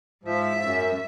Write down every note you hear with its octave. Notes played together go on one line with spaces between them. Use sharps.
G#2 F3 E5
F#2